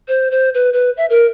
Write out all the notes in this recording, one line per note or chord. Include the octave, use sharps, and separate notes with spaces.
C5
C5
B4
B4
E5
A#4